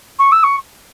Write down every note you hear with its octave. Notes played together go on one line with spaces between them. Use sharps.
C#6
E6
C#6